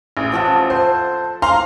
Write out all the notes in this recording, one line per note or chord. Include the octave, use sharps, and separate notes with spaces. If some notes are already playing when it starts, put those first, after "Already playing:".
A1
F3 A4 F#5
C5
F5 A#5 C6